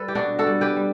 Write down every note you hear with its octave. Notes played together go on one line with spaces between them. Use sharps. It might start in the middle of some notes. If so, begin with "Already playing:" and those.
Already playing: G3 A4 B4
G4
B2 D4 F#4
F#4 A4
G3
G4 B4
G3